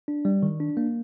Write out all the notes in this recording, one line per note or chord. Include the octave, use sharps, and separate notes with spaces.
D4
G3
D#3
D4
A#3